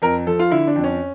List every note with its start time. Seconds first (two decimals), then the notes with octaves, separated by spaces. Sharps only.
0.02 F2 A#4
0.27 F3 A4
0.39 F4
0.51 D3 E4
0.67 D4
0.76 F2
0.84 C#4